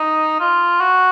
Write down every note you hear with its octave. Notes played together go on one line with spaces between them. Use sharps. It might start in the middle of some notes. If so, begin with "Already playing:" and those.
Already playing: D#4
F4
F#4